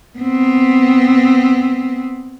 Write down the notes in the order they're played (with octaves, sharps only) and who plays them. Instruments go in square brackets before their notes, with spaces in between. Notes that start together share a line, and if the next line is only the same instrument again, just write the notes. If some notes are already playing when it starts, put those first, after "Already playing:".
[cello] B3 C4